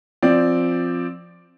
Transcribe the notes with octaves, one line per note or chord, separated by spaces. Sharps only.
F3 C4 D5